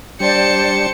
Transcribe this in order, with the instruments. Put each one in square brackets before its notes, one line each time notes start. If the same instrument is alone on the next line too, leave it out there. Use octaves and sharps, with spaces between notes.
[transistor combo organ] G3 D4 [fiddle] C5 A5 [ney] D5 [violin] G5 C#7